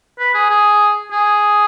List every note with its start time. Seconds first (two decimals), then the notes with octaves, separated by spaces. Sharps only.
0.19 B4
0.34 G#4
0.50 G#4
1.12 G#4